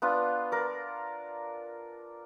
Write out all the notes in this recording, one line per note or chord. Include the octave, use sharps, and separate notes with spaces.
B3 D4 F4 B4
A#4 D5